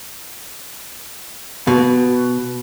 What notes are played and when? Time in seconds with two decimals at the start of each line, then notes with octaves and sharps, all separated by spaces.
1.67 B2